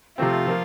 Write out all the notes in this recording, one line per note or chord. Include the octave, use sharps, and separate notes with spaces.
C3 F3 A3 C4 F4
F3 A#3